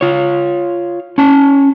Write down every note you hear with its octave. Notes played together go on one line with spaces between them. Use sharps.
F4 C#5
C#4 A5